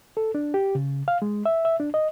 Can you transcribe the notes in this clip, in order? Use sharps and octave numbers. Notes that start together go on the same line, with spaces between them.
A4
D4
G4
C#3
F5
G#3
E5
E5
D4
D#5